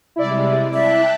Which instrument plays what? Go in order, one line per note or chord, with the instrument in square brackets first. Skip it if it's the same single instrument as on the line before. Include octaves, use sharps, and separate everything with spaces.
[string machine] C3 G3 G#3 [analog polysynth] E4 D5
[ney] E5 [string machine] G5 A5 F#6